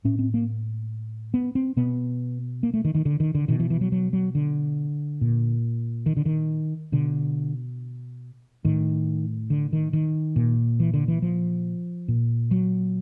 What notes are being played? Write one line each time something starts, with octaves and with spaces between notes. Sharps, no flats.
A2 C#4
C4
A#3
B3
C4
B2 B3
A#3
A3
D#3
D#3
D3
D#3
D3
B2 D#3
E3
E3
F#3
F#3
F#3
D3
A#2
D#3
D3
D#3
B2 D3
A2 D#3
D3
D#3
D#3
A#2
E3
D3
E3
F3
A#2
F#3